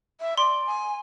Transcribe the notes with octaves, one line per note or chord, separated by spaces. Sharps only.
E5
D5 C6
G#5